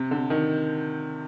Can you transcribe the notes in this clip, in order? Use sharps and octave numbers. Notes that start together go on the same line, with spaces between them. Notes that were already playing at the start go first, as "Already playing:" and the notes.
Already playing: C3
D3
D#3